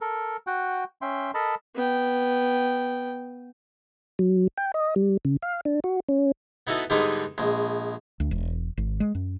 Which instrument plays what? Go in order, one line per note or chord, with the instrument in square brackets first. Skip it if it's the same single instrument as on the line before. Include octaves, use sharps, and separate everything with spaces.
[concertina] A4 A#4
F#4 F#5 G5
C#4 E5 G5 C6
A4 A#4 D#5 A5 B5
[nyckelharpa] B3 G5
[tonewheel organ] F#3
G5
D#5
G3
C#3
F5
D4
F#4
C#4
[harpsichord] B3 D#4 E4 F#4 A4
G#2 D3 G3 G#3 B3 D#4
A#1 G#3
[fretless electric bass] D2
E1
G#1
G#3
F#2